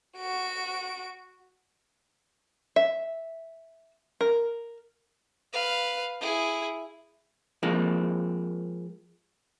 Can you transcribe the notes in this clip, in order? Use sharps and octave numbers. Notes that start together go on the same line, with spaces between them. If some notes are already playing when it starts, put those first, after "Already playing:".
F#4 D7
E5
A#4
B4 F5
E4 G#4
F3 G#3 A#3 C4